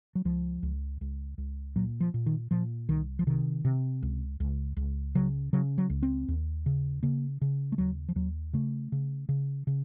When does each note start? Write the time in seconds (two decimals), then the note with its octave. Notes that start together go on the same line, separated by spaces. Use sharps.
0.15 F#3
0.25 C#2 F3
0.63 C#2
1.01 C#2
1.38 C#2
1.76 A#2 F#3
2.01 F3
2.14 A#2
2.26 D#3
2.51 A#2 F3
2.89 C2 D#3
3.19 F3
3.27 C3 D#3
3.65 C3
4.02 C#2
4.40 C#2
4.77 C#2
5.15 C#3 F#3
5.53 C#3 F#3
5.78 F#3
5.90 C#2
6.03 C4
6.28 D#2
6.66 C#3
7.03 C#3 A#3
7.42 C#3
7.72 A3
7.78 D#2 F#3
8.09 F3
8.16 D#2 F#3
8.53 C#3 A3
8.92 C#3
9.29 C#3
9.67 C#3